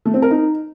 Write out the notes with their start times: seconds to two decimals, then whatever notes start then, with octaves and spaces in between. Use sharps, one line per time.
0.05 A3
0.14 C4
0.22 A#4
0.31 D#4